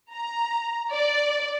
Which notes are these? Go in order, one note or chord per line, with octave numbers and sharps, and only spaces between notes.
A#5
D5